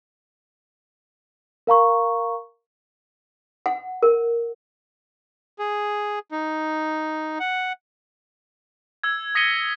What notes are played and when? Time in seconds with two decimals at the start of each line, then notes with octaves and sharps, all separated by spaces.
1.67 A#4 F5 A#5 C#6
3.66 F#5
4.03 A#4
5.59 G#4
6.32 D#4
7.40 F#5
9.03 E6 G#6
9.35 D#6 A#6 B6 C#7 D#7 G7